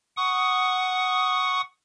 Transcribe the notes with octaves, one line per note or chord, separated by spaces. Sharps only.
F#5 C#6 D#6